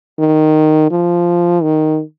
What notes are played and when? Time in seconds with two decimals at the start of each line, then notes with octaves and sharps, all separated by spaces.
0.19 D#3
0.91 F3
1.63 D#3